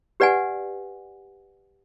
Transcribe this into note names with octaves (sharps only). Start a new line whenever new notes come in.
G4 B4 D5 F#5 G#5